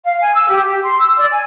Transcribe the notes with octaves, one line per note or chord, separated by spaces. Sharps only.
F5
G#5
E6
G4
G4
C6
E6
D5
G#5